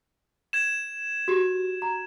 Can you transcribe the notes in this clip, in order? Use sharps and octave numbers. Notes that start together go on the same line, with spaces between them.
G#6 E7
F#4 G4
A#5